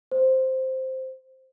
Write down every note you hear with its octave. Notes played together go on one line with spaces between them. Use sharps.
C5